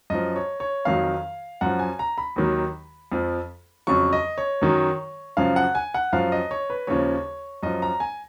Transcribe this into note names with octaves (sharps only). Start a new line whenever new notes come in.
F#2 F3 D#5
C#5
C#5
F2 D#3 F#3 F5
F#2 F3 F#5
G#5
A#5
B5
D#2 D#3 F#3
F2 F3
F2 C#3 F#3 C#6
D#5
C#5
F#2 D#3 F#3
F#2 C#3 F3 F5
F#5
G#5
F#5
F#2 F3 F5
D#5
C#5
B4
D#2 C#3 F3 C#5
F#2 F3 D#5
A#5
G#5